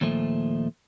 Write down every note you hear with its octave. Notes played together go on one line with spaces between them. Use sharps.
D#2 A#2 F3 A3